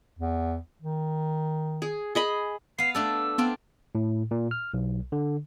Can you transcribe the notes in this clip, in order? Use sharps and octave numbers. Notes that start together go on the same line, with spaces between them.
E2
D#3
G#4
G#4 D#5 B5
B3 F5 C7
A3 D4 A4 E6
B3 C4 D4 F4
A2
A#2
F6
B1
D3